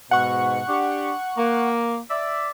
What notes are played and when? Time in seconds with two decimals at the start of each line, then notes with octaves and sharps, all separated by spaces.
0.11 G#2 B2 F#5 C#6
0.69 D4 G4
1.38 A#3
2.10 D5 E5